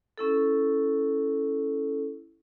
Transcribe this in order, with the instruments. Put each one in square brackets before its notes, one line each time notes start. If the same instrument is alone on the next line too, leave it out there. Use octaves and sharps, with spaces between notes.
[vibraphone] C#4 E4 A4